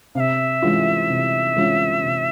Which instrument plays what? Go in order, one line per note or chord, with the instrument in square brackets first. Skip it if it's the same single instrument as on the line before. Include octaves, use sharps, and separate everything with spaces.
[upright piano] C3 [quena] E5 F5
[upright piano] E3 G#3 C#4 F4
C3
E3 G#3 C#4 F4
C3